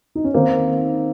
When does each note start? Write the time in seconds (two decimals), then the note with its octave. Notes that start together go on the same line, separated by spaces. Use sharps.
0.15 D#4
0.24 C#4
0.34 D#3 A#3 C4